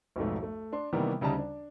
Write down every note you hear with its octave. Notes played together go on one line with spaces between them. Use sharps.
B1 F2 G#2 A3
A3
D4 C6
C3 D#3 E3 G3 A#3 B3
D2 C#3 G3 D#4 A5 A#5
D4